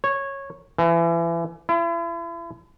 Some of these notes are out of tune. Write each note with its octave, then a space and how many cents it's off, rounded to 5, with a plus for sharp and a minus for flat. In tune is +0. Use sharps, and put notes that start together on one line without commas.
C#5 -15
E3 +30
E4 +40